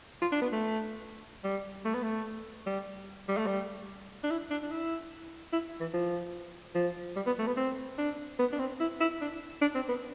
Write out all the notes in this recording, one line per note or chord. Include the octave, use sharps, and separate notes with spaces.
F4
D4
B3
A3
G3
A3
B3
A3
G3
G3
A3
G3
D4
E4
D4
D4
E4
E4
E3
F3
F3
G3
B3
A3
B3
C4
D4
B3
D4
C4
E4
E4
D4
D4
C4
B3